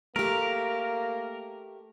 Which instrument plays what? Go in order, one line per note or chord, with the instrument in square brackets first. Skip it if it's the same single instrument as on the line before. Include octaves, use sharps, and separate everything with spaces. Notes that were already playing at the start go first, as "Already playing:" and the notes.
[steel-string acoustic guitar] A3 G4 [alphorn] A#3 [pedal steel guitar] A#4